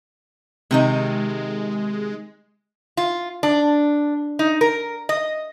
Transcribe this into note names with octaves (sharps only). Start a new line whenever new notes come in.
C3 D#3 G#3 D#4
F4
D4
D#4
A#4
D#5